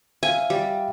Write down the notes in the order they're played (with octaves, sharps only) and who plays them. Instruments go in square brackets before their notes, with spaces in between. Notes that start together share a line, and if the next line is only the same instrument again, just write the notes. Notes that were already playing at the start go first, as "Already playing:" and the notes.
[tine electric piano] E5 F5 [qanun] G#5
[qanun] G3